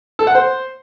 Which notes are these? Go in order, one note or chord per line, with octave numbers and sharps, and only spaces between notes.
A4
F#5
C5